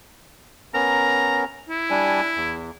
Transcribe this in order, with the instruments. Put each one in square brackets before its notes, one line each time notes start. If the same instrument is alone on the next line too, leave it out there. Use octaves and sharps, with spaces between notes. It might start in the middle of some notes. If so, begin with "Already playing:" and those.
[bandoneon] B3 C#4 A#4 [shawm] A#5
[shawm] E4
[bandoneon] G3 D4 G#5
E2